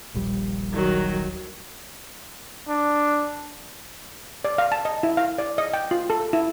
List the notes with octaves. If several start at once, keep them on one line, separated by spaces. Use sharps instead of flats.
D#1 A#1 G3
D#3 F#3
D4
D5
F5
A5
D#5
E4
F5
D5
D#5
G5
F4
A4
E4